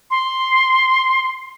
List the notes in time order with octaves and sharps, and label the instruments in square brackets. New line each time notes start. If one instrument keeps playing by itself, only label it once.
[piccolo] C6